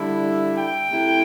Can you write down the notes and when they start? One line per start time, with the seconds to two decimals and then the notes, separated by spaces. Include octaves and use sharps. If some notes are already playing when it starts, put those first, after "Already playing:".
Already playing: D3 G3 E4
0.25 E5
0.58 G5
0.89 C3 A3 E4